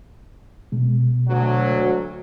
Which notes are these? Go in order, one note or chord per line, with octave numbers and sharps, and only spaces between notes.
B2 G#3
D2 F#3